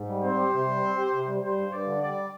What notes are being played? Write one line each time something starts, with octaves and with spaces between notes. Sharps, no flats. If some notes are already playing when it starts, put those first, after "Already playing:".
Already playing: G#2
G3
C4 C5
G4
C3
G3
C4
G4
C3
G3
G3 C5
G2
G2 D5
D3
G3 D5